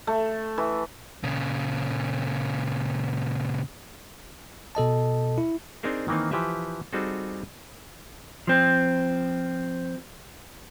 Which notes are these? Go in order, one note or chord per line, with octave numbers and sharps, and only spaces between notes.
A3
E3
A#2 C#3
B2 A4 D#5 A5
E4
C4 D4 D#4 G#4 A#4 C5
D#3 E3 A#3 C4 D#4
E3 F3 G4 B4 E5
G3 C4 D#4 F#4 G#4 A4
F3 C4